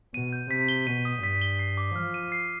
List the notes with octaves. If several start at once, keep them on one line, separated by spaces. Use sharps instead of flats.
B2 D#7
G6
C3 B6
G7
B2 D#7
D#6
G2 B6
G7
C7
D6
F3 F6
D#7
C7